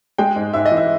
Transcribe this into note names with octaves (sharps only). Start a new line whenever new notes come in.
G#3 G5
G#2
G#2 E5
D#5
E3
E5